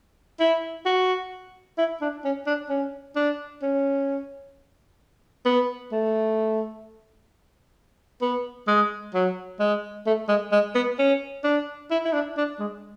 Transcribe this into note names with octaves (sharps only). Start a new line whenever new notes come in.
E4
F#4
E4
D4
C#4
D4
C#4
D4
C#4
B3
A3
B3
G#3
F#3
G#3
A3
G#3
G#3
B3
C#4
D4
E4
E4
D4
D4
G#3